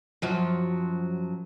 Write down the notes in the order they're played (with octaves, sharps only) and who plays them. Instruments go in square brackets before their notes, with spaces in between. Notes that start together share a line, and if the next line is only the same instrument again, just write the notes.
[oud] F#2 F3 F#3